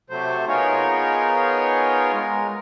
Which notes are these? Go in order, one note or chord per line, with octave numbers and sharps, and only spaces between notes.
C3 F#3 A3 C5
B3 D#4 F4 G#4 A#4 C#5
G#3 A#4